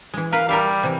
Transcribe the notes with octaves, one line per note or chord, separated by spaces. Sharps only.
E3 G#3
A#4 B4 F5
G3 A#4 E5 F5
C3 E3